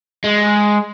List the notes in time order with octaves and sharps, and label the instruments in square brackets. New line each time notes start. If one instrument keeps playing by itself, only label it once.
[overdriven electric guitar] G#3